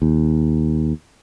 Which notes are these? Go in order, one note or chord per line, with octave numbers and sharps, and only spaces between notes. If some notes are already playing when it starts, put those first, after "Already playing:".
D#2